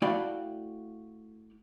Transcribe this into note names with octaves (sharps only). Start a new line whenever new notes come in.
A3 E4 F#4 D5 F5 G5